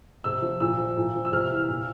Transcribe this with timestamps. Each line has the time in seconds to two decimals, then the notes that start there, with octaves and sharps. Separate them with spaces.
0.24 C3 E6
0.42 F3
0.60 A#2 E6
0.78 F3
0.97 A#2
1.15 F3
1.25 E6
1.32 C3 F6
1.50 E3
1.68 A#2